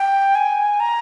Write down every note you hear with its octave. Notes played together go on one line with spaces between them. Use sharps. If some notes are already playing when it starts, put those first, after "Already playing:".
Already playing: G5
G#5
A#5